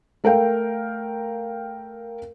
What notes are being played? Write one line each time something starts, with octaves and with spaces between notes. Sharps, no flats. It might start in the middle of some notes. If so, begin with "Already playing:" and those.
A3 A#4 F5 G5